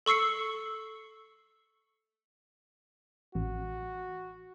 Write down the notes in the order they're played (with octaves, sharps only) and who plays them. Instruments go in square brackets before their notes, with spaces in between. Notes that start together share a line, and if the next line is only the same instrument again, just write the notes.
[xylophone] A4 C#6 E6 C7 C#7
[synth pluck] A1 [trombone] F#4